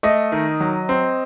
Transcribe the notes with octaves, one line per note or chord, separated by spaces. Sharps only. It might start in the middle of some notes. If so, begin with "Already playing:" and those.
A3 D#5
D#3
F#3
C4